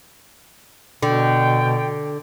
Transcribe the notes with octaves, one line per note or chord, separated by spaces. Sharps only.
B2 D3 G5